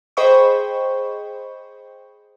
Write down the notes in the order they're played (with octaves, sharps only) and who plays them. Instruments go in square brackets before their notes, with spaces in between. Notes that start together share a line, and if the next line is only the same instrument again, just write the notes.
[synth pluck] G#4 C5 D#5 G5 B5 C#6